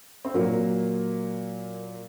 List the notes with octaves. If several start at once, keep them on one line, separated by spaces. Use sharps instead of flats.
C4
A#2 F#3 A#3